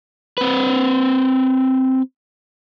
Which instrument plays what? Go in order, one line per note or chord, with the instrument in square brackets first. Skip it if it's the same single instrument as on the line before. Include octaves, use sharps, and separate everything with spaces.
[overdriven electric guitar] C4 B4